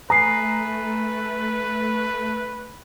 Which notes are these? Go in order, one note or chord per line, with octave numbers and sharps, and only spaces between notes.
A3 B4 G#5 A#5 D#6 C7